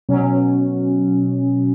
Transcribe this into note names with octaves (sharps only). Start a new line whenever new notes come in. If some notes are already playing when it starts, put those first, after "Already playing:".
B2 F#3 C#4